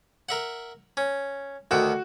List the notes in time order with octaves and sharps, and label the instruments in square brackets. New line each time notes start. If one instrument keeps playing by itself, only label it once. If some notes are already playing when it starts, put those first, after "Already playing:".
[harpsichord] A#4 E5 F#5
C#4
[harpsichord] D2 D#3 G5 [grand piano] F#4